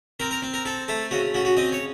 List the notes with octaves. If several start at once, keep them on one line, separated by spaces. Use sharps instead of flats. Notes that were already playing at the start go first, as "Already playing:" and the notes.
C4 A#4
A#4
C4
A#4
C4 A4
A3 A4
C#3 F#4
C#3 F#4
F#4
C4 D#5
C#5